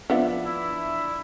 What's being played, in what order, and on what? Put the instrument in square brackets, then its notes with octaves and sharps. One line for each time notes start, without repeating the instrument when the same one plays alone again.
[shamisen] F3 B3 [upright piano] D4 E5
[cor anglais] E4